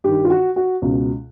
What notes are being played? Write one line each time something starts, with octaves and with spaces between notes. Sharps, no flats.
G2 D#3 G4
F4
F#4
F#4
C#2 B2